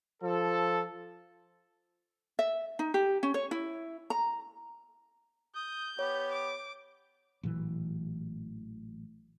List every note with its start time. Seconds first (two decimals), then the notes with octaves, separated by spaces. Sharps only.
0.23 F3 A4
2.39 E5
2.79 D#4
2.94 G4
3.23 C#4
3.34 C#5
3.51 E4
4.10 A#5
5.56 D#6 G6
5.99 B3 G4 C#5
6.32 D6
7.43 A1 A#2 E3 F#3